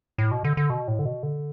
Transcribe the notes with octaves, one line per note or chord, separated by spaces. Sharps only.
A2
B2
D3
D3
B2
A2
D3
B2
D3